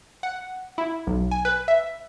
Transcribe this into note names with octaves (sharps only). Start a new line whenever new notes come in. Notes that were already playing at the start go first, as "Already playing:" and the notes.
F#5
E4
B1
G#5
B4
E5